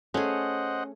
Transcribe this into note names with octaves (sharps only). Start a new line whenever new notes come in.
A3 C#4 G#4 C5 D#5 F#5